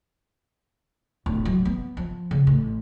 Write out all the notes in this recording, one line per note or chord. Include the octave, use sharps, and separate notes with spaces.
D1
F#3
B3
F3
C#3
A1